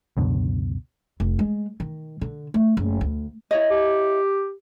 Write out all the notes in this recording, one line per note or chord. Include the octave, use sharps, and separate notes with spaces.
C#2 F#2 B2 D3
F1
G#3
D#3
D3
A3
F#1
D2
E4 C#5 D#5
G4